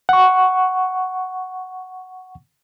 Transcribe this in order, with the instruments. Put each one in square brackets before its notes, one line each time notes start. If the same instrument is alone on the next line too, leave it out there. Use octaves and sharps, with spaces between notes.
[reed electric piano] F#5 C#6